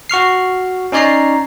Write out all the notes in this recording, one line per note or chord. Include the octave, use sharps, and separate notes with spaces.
F#4 C#6 F6 C7
C#4 D#4 C#5 D5 A#5 C7